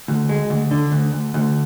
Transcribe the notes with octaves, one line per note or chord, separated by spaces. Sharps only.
D2
G#3
D2
D3
D2
D2
D2